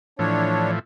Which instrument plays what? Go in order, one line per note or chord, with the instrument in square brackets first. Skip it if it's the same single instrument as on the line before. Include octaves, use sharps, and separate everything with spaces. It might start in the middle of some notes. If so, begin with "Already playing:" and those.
[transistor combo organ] A2 E3 F3 [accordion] D4 C#5